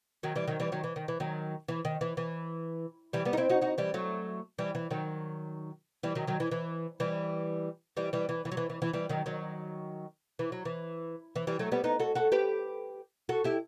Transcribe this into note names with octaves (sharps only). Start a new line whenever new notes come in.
D#3 F#3
E3 G3
D#3 F#3
E3 G3
D#3 F#3
E3
D#3
E3
D#3 F#3
E3
D#3
E3
E3
E3 G3
G3 B3
D#4
C4 E4
D#4 F#4
D#4 F#4
E3 G3
F#3 A3
E3 G3
E3
D#3 F#3
E3 G3
D#3 F#3
D#3 F#3
E3
E3
E3 G3
E3 G3
E3 G3
E3
E3
F#3
E3
E3
E3
E3 G3
D#3 F#3
D#3 F#3
E3
F#3
E3
E3
E3 G3
F#3 A3
G3 B3
B3 D#4
F#4 A4
F#4 A4
G4 B4
F#4 A4
E4 G4